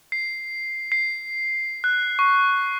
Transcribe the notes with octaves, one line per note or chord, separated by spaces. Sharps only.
C7
C7
F#6
C#6